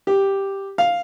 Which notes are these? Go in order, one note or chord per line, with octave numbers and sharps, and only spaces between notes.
G4
F5